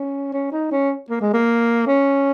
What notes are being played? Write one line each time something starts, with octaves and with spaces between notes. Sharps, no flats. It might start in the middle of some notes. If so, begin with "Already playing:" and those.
Already playing: C#4
C#4
D#4
C#4
A#3
G#3
A#3
C#4